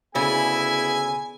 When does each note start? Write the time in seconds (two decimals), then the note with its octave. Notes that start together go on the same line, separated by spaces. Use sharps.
0.15 D2 C#3 B3 E4 G#4 D5 G#5